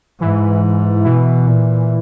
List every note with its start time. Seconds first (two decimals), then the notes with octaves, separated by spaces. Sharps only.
0.20 G#2 E3
1.04 B2 E3
1.47 A#2